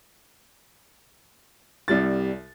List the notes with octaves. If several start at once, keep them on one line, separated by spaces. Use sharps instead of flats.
C2 G3 A6